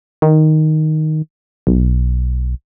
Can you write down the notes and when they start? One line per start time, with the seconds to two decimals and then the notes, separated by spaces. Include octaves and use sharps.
0.22 D#3
1.67 B1